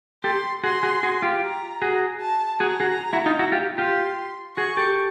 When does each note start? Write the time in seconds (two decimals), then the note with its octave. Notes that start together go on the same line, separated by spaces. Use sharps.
0.24 G4 A4 C6
0.64 F#4 G#4 C6
0.83 F#4 G#4
1.03 F#4 G#4
1.22 F4 G4
1.42 A#5
1.82 F#4 G#4
2.21 A5
2.60 F#4 G#4 A#5
2.80 F#4 G#4
3.13 E4 F#4
3.26 D#4 F4
3.39 E4 F#4
3.52 F4 G4
3.78 F4 G4 C6
4.57 F#4 G#4 C#6
4.77 G4 A4